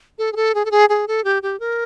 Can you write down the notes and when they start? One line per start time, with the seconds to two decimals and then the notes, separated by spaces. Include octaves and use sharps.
0.19 A4
0.33 G#4
0.36 A4
0.55 G#4
0.65 A4
0.71 G#4
0.89 G#4
1.08 A4
1.24 G4
1.43 G4
1.60 A#4